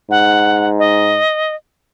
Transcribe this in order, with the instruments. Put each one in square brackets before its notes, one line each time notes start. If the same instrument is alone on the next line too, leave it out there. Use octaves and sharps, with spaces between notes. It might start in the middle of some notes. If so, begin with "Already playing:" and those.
[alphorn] G#2 [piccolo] F#5
[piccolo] D#5